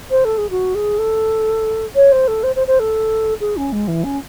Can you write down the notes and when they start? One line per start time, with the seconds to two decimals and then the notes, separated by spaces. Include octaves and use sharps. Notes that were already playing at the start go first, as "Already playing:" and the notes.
0.10 C5
0.24 A4
0.37 G#4
0.50 F#4
0.74 G#4
0.98 A4
1.95 C#5
2.12 C5
2.27 A4
2.43 C5
2.55 C5
2.67 C5
2.79 A4
3.40 G#4
3.56 C#4
3.72 G#3
3.87 E3
4.04 C#4